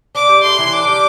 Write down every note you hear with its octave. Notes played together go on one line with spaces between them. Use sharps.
D4 D6
G3
A2 C6
E3
D4 D6
G3